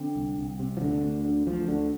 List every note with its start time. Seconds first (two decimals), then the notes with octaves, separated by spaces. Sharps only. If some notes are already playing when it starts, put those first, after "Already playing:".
Already playing: D3 C4
0.16 C2
0.38 C2
0.59 C3
0.77 F3
0.81 D2 D3
1.03 D2
1.25 D3
1.47 D2 F3
1.68 D2 D3